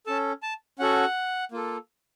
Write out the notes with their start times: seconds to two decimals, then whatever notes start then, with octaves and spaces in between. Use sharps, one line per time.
0.06 C#4 A4 A5
0.43 A5
0.79 C#4 F#4 A4 F#5
1.52 A#3 F4 A4